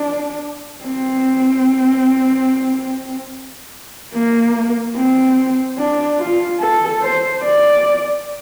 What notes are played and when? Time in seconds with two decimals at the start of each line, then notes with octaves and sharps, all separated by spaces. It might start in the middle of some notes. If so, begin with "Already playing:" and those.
Already playing: D4
0.84 C4
4.14 A#3
4.97 C4
5.78 D4
6.20 F4
6.61 A4
7.02 C5
7.43 D5